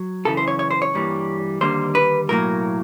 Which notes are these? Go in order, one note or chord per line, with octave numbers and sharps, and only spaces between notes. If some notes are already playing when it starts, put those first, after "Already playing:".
Already playing: F#3
F#2 C#3 E3 A4
C5
C#5
C#5
C5
C#5
G2 E3 G3 A#3
D#2 D3 G3 A#3 C5
B4
B1 A2 F#3 A#3 A#4